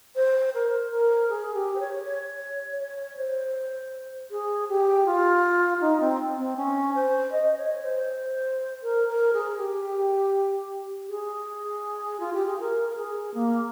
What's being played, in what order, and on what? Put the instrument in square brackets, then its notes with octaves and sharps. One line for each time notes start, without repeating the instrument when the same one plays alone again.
[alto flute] C5
A#4
A#4
G#4
G4
C5
C#5
C#5
C#5
C5
G#4
G4
F4
D#4
C4
C4
C#4
C5
D#5
C#5
C5
A#4
A#4
G#4
G4
G#4
F4
G4
G#4
A#4
A#4
G#4
A#3